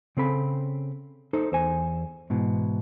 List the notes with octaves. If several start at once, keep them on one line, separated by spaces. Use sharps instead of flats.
C#3 C4 A4 B5
D#4 A4 C5
E2 C5 G#5
G#2 B2 E3